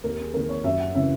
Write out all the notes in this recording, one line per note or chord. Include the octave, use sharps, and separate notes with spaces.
D#2 A#4
G#4
D#3 A#3 A#4
C#5
F#2 E5
F#5
C#3 E3 E5